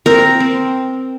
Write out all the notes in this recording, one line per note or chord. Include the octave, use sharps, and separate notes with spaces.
C4 A#4
C4